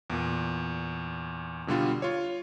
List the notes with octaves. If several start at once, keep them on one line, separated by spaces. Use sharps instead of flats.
E2 A#2
B2 D3 G3 F4
F4 C#5